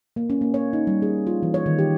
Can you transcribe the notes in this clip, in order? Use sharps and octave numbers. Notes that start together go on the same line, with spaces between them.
A#3
C#4
A#3
C#5
D#4
G3
G#4
F4
E3
C#5
D#3
G4